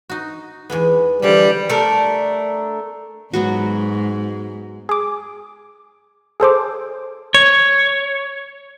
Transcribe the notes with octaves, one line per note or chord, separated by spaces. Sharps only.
D#4 F#4
E2 G#3 B3
D3 E3 F3 G3
A3 D4 A#4
G#2 F#3 B3 F#4
G#4 D6
G#4 A4 C5 D6
C#5